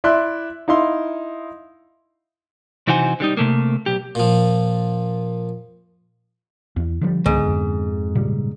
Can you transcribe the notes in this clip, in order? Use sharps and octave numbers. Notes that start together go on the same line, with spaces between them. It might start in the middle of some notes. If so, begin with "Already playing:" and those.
E4 D5 E5 C6 F#6
D#4 E4 F5 C6
C3 E3 D#4 F#4 C5 G#5
D3 G3 D#4
C3 A3 A#3
B1 G4
A#2 F3
E2
D3 F3 G3
C#2 G#2 D3 B3
F2
A#2 C#3 G3